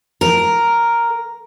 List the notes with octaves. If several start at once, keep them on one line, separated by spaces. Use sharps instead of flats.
A#4